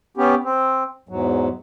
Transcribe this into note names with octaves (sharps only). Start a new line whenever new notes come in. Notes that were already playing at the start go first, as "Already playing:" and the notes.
B3 C#4 G4
C4
E2 G#2 F#3